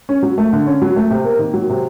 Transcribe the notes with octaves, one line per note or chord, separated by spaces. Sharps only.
C#4
F#3
A3
D3
C#4
F#3
A3
C3
A#3
D#3
F#3
C3